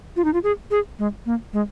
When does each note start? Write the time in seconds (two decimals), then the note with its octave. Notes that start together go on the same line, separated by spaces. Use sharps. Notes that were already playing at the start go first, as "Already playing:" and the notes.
0.17 F4
0.25 D#4
0.34 F4
0.44 G#4
0.71 G#4
0.99 G#3
1.26 A#3
1.53 G#3